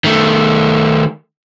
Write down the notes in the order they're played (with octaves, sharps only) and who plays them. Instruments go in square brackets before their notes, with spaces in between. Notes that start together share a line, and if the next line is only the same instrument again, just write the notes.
[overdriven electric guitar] D#3 A3